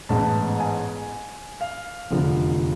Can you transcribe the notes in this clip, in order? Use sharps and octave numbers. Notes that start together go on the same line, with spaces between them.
A1 G#2 G#3 B3 A5
G#5
F5
F1 E2 D3 F3